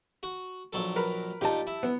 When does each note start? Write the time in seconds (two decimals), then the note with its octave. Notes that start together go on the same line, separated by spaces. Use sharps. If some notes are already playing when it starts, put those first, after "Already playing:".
0.23 F#4
0.73 A#1 F#3 A4
0.96 A#4 B4
1.41 A#2 D#4 G4 A5
1.67 E4
1.83 B3